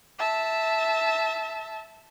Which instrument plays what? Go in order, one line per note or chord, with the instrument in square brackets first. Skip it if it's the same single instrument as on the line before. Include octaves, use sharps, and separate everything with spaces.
[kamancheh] E5 A5